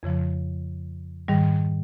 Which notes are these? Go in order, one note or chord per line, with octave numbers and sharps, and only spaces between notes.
F2 C#3 F3
G#2 D#3 G3